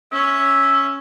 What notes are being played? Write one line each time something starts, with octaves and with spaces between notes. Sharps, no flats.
C#4 C#5 E5